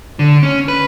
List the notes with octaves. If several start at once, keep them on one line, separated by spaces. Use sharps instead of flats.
D3
C#4
B4